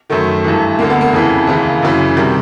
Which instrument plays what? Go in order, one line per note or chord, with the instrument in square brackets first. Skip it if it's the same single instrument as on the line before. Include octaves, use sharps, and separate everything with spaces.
[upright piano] F#2 D#3 A3
G2 E3
D2 D3 A#3
B3
A#3
F2 C#3 E3
D#2 C#3 E3
F#2 C#3 E3
C3 D#3 G3